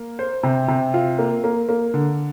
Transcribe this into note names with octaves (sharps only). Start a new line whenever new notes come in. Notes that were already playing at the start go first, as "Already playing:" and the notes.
Already playing: A#3
C5
C3
C3
F4
A#3
A#3
A#3
D3